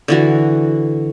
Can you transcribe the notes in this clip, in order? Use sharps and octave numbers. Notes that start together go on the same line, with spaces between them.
D3 E3 F#4